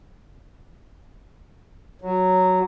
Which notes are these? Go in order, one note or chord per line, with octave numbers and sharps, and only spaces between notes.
F#3